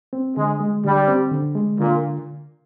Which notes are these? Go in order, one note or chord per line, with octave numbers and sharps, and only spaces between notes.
C4
D3 G#3
G#3
D3 G3
C4
D3
G#3
A#2 D3